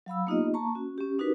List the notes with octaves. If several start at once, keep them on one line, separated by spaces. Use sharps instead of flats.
F#3 F5 B5 E6
A#3 B3 D#4 F4 G4 D#5
A#3 A5 A#5 C#6
C#4 F#4
C#4 G4
D4 D#4 F#4 G4 A#4 B4